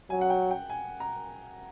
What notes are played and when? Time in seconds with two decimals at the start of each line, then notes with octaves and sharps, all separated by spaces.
0.10 F#3 G#5
0.21 F#5
0.30 G5
0.51 G5
0.70 G#5
1.00 A#5